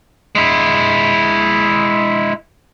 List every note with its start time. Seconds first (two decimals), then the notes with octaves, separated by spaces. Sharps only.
0.35 G#3 E4